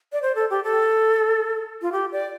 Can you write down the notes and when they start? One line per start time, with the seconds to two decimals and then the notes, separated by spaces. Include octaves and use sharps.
0.12 D5
0.22 C5
0.35 A4
0.50 G4
0.64 A4
1.82 F4
1.92 G4
2.12 D5